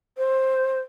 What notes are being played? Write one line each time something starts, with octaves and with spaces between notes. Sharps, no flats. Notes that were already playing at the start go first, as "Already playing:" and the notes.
C5